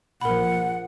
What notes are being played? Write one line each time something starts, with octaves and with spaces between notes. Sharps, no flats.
A#1 F3 A#4 F#5 B5